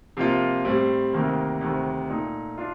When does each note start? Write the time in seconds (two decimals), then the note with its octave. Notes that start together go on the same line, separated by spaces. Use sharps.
0.17 C3 F3 A#3 F4
0.65 A2 G3 C4
1.13 D2 C3 D#3 A#3
1.61 D2 C3 D#3
2.09 A#2 A3 D#4
2.58 D4 F4